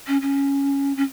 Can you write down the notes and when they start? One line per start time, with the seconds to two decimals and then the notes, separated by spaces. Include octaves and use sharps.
0.07 C#4
0.22 C#4
0.97 C#4